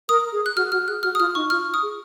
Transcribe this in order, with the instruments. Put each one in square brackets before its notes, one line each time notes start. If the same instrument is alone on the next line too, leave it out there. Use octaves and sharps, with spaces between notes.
[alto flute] A#4 [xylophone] D#6
[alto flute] G#4
[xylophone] F#6
[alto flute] F#4 [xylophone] F6
[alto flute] F#4 [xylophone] F6
[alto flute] G#4 [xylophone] F#6
[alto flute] F#4 [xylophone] F6
[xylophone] D#6
[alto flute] F4 [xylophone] F6
[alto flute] D#4 [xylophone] C#6
[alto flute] F4 [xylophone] F6
[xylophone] D#6
[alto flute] G#4